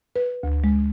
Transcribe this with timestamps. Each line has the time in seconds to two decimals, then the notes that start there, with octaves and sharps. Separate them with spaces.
0.16 B4
0.43 D2
0.64 G#3